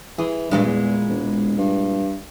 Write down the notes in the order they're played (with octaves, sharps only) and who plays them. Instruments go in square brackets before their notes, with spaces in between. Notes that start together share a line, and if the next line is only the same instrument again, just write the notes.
[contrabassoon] E3 [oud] G#4
[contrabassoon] G2 [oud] A#2 E3 G#3
[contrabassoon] E2
E1
G2